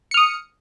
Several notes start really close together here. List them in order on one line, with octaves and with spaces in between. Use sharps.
C#7 F6 D#6